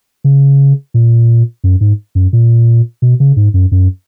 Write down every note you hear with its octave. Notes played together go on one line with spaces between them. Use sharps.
C#3
A#2
F#2
G#2
F#2
A#2
B2
C#3
G#2
F#2
F#2